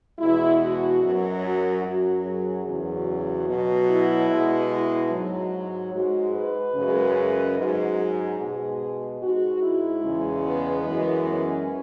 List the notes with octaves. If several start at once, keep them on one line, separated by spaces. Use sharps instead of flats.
E2 B2 G#3 E4
F#4
F#2 F#3
F#4
F#2 F#3 F#4
G#4
E2 C#3 F#3
F#4
B2 F#3
E4
B2 G#3
E4
G#2 F#3
G#2 G#3 F#4
B4
F#2 C#3 G#3
G#2 F#3
G#4
B2 G#3 G#4
G#2 G#3 F#4
E4
E2 C#3 G#3
B3
F#2 E3 G#3
C#4